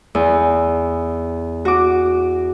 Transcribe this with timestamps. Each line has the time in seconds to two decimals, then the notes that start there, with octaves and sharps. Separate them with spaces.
0.15 E2
1.65 F#4 D6